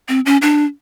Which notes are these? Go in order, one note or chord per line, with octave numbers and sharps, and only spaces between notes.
C4
C#4
D4